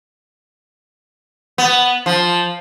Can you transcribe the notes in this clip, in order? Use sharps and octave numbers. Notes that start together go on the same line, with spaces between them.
B3
F3